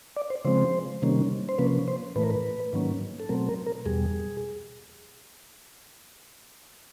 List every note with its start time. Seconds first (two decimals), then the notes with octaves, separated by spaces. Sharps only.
0.16 D5
0.30 C5
0.45 C#3 F3 G#3 C4 C5
1.02 C3 D#3 G3 A#3 C#4
1.49 C5
1.58 C3 F3 A#3 C#4 B4
1.88 C5
2.16 A2 E3 A3 B4
2.23 A#4
2.30 B4
2.73 G#2 D#3 F#3 A#3 C#4
3.20 A4
3.29 B2 F#3 A3 C4 A#4
3.48 A#4
3.66 A#4
3.86 E2 B2 G3 G#4